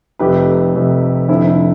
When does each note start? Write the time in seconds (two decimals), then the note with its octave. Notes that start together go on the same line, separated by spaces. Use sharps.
0.19 F1 F2 C3 G4 B4
0.74 F1 F2 C3
1.28 F1 F2 D3 F3 E4
1.47 E4